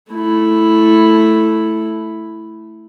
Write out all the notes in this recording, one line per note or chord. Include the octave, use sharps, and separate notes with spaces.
A3 E4